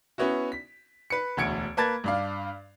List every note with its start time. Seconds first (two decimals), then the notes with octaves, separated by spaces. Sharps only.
0.18 B3 C#4 E4 F#4
0.52 B6
1.10 B4 C#7
1.37 E1 D2 G#6 C#7 D7
1.77 A#3 B4 A5 G#6 A6
2.04 G2 D4 F5